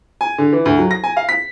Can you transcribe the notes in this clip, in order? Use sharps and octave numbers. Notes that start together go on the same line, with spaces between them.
G#5
D3
E3
D2
F#3
A#6
G#5
F5
B6